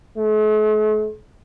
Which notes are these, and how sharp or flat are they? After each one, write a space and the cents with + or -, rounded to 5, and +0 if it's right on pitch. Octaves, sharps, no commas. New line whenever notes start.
A3 -45